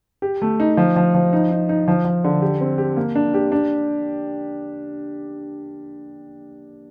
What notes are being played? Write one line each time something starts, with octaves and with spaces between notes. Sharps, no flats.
G4
A3
D#4
F3
F3
F3
D#4
D#4
D#4
F3
F3
D3
G4
C4
G4
A#3
D4
G4
D4